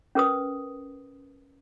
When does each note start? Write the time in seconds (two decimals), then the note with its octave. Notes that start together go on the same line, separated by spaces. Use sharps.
0.15 C#4 A#4 B4 D#6